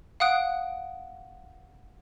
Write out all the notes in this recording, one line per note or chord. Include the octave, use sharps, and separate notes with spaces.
F5 F#5 D#6 F#6 D7